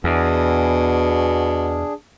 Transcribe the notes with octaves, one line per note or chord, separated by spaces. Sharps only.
E2 B2 D4 G#4